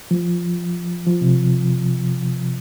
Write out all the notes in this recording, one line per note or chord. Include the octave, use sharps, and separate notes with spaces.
F3
F3
C3